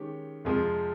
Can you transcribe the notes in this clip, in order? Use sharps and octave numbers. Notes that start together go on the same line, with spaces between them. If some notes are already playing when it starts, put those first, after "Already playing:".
Already playing: D#3 G#3 C#4 G4
F2 C3 F3 G#3 C4